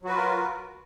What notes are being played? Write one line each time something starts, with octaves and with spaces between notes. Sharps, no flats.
F#3 F4 F#4 A#4 B4